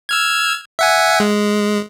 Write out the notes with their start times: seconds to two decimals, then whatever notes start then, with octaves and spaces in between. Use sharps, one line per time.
0.09 E6 F6 G#6
0.79 E5 F#5 G#5
1.20 G#3